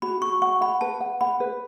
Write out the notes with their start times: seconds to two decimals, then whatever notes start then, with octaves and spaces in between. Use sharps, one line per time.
0.02 F#4 B5
0.21 F#4 C#6
0.42 F#5 C#6
0.61 F#5 B5
0.81 B4 A5
1.01 F#5
1.21 F#5 B5
1.40 B4